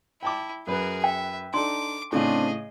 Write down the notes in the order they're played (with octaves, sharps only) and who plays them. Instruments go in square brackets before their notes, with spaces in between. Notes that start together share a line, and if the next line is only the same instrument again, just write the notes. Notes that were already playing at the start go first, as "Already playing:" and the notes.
[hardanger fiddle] E4 [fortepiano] G5 A5 D6
[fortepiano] F#2 B4 [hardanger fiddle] G#4 A#4
[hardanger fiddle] E5 [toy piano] G5
[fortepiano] D4 D#4 A4 [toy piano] C6 [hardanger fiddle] D6
[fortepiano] A2 C#3 [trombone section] C4 D4 [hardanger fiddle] G#4 D#5